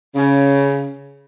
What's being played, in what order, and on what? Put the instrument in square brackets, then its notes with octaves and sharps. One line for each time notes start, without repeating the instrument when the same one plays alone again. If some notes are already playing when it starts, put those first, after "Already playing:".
[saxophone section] C#3